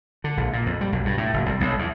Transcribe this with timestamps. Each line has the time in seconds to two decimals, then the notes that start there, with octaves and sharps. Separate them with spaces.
0.24 D3
0.37 A#1
0.53 A#2
0.66 F2
0.81 G3
0.92 B1
1.05 G2
1.18 A2
1.34 F#1
1.46 C2
1.60 B1
1.79 E2